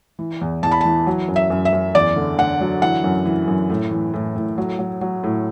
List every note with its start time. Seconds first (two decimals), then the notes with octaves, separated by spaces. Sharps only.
0.19 E3
0.41 E2
0.63 E2 A5
0.71 B5
0.81 E3 A5
1.07 F#3
1.28 F#2
1.36 E5
1.50 F#2
1.65 E5
1.73 F#2
1.95 E2 D5
2.16 D3
2.38 D3 F#5
2.61 F#3
2.82 E3 F#5
3.04 F#2
3.25 E3
3.48 F#2
3.70 A2
3.91 E3
4.13 A2
4.36 A2
4.58 F#3
4.79 F#3
5.01 F#3
5.23 A2